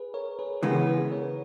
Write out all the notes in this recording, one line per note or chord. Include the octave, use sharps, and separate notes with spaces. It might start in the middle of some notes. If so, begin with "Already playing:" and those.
Already playing: G#4 B4
A#4 C#5
G#4 B4
C#3 E3 G#3 B3 G4 A#4
G#4 B4
A#4 C#5